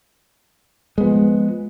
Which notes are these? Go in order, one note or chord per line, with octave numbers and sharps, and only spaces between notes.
F3 G#3 B3